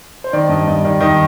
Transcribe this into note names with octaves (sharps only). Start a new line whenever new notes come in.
C5
D#3 D5
G2 D#5
G2 D#5
D#3 D5
D#3 D#5